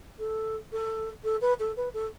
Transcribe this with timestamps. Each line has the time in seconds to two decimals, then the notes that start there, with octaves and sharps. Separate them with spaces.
0.19 A4
0.72 A4
1.24 A4
1.41 B4
1.60 A4
1.77 B4
1.94 A4